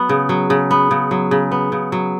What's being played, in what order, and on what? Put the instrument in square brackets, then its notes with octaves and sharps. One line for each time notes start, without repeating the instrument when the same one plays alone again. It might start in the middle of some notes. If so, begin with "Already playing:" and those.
Already playing: [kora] F#3 B3
C#3
F#3
C#3
B3
C#3
F#3
C#3
B3
C#3
F#3